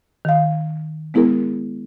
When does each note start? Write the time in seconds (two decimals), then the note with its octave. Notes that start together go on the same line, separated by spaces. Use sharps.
0.25 D#3 F5
1.14 G#3 B3 E4 G#4 A#4